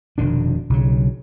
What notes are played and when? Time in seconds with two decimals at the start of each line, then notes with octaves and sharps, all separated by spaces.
0.18 F1 B2 D#3 D4
0.70 B1 C#3 F#3